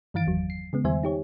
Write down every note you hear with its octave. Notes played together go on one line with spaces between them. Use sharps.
G2 D#3 E3 F5 A6 D7
G1 E2 F#3
C7
C#3 G#3 B3
E2 D#3 G3 C5 E5 G#5
D#4 G4 C#5